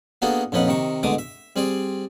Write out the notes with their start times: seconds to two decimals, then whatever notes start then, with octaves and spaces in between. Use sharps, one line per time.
0.22 A#3 B3 D4 F#4 G#4 A4
0.52 A#1 F2 C#4 D#4 B4 F#5
0.68 C3 D#3 D#4 C#6
1.03 B2 D3 G#3 A3 D6 D#6
1.18 E5
1.56 G3 C4 G#4 D5